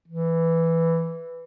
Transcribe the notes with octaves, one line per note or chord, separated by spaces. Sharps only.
E3